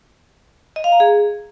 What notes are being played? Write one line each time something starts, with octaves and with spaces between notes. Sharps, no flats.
D#5
F5
A#5
G#4